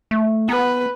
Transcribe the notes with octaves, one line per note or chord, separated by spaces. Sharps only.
A3
B3 B4